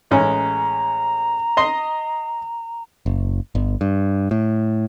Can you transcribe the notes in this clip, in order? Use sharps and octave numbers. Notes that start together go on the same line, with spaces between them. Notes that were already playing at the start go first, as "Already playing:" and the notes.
A1 G#3 C#4 A#5
D#5 C6
F#1
G1
G2
A2